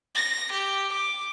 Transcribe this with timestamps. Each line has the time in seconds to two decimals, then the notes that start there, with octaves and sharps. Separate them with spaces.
0.15 A#6
0.52 G4
0.92 D6